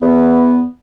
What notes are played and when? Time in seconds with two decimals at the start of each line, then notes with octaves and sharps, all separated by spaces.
0.02 E2 B3